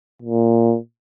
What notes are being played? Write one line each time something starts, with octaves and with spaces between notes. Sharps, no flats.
A#2